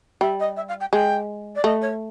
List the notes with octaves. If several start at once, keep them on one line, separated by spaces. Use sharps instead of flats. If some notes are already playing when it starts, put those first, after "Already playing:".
G3 E5
D#5
E5
F5
G5
G#3 G5
D5
A3 D#5
C#5